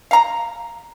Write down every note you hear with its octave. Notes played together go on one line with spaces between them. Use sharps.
F5 A#5